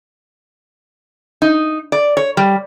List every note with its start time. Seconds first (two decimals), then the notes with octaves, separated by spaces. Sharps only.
1.42 D#4
1.92 D5
2.17 C#5
2.37 G3